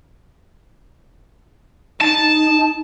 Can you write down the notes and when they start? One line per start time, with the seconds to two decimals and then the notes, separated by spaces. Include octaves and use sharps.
2.01 D#4 A5